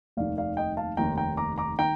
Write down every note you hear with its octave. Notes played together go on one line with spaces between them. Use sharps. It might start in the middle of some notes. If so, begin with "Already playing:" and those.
F1 D#2 D#3 D5 F5
D5 F5
D#5 G5
F5 A5
F1 D#2 D#3 G5 A#5
G5 A#5
A#5 D6
A#5 D6
D#3 G5 A#5